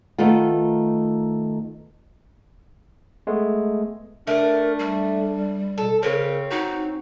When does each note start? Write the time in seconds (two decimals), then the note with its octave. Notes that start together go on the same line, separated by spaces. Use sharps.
0.18 D#3 A3 B3 D#4 F4
3.27 G#3 A3 B3
4.27 A3 D4 A#4
4.79 G3
5.78 B2 A4
6.03 C#3 C4 C#4 A#4
6.51 D#4 F#4